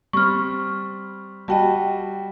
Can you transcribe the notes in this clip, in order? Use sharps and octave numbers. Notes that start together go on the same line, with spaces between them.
G3 C4 C#6 F6
G3 F#4 D#5 G5 A5